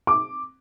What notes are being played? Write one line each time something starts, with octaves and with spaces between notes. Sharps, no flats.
D6